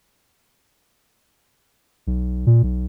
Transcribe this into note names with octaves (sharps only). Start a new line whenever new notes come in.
B1
A#2
B1